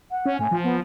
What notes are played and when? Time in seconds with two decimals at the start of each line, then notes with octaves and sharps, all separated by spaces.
0.11 F#5
0.26 C#4
0.39 A2 G#5
0.51 F3
0.64 B3